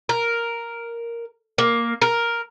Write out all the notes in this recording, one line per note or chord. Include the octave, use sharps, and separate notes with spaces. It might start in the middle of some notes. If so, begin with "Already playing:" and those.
A#4
A#3
A#4